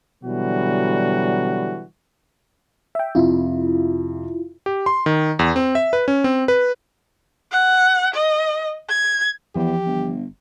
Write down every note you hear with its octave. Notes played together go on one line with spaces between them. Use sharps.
B2 D3 E3 F#3 G3 F#4
E5 G5
F2 C3 E4 F4
G4
C6
D#3
E2
C4
E5
B4
C#4
C4
B4
F#5
D#5
G#6
E2 E3 F3 G4
G1